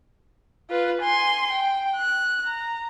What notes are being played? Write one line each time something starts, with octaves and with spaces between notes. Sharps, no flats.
F4 B4
G#5 C6
G5
F#6
A#5